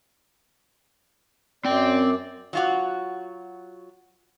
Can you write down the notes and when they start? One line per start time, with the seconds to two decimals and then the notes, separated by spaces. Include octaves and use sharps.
1.65 F#2 C4 D5 G5
2.53 F#3 F4 F#4